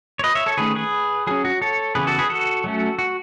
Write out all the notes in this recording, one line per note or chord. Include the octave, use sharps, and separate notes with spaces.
C#5
B4 D#5
C#5 E5
A4 C#5
D#3 A3 C#4 G#4 B4
G#4 B4
F#3 C#4 G#4
F#4
A4 C#5
C#3 E3 B3 G#4 B4
F#4 A4
G#4 B4
F#4 A4
F#3 A3 C#4
F#4